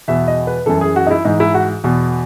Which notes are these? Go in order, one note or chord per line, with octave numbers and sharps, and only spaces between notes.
E2 B2 E5
D#5
B4
F#2 E3 A4
G#4
F#4
D#4
E4
G#2 E3 D#4
E4
F#4
E2 B2